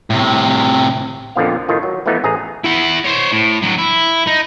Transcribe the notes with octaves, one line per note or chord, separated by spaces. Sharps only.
A2 C3
F2 A#2 D3 F3 B3 F5
A2 D#3 F4
F#3
E3 F3 A3 B3 D#4
A1 G#4 A#5
E4 F#5
C5 C#5
A2
D3 F#3
E4
D#4